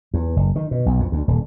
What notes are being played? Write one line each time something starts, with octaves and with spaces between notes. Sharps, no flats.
E2
F#1
D#3
B2
B1
F2
D2
D#1